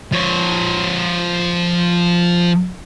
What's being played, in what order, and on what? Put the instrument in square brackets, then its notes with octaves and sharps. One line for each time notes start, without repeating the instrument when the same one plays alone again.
[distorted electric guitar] F3 C#5